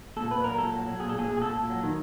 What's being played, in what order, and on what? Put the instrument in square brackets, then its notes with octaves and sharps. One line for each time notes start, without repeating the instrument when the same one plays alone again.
[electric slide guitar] A#2 A4
A#2 B4
F#3 A#4
A#2 A4
F#3
F#3
A#2 G#4
A4
A#2
G#4
A#2
G#4
A#2 A4
A#2
F#3
D#3